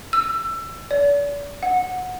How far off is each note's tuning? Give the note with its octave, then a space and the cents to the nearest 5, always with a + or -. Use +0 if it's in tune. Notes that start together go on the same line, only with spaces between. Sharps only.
E6 +25
D5 -40
F#5 -15